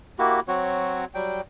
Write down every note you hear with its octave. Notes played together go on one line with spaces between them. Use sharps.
A#3 E4 F#4 G4
F#3 C4 F#4 C#5
F#3 G3 G5